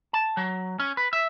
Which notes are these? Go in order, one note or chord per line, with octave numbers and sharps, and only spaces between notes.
A5
F#3
C#4
B4
E5